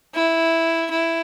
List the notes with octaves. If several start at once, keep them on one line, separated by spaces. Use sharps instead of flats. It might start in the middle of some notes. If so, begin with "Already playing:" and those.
E4
E4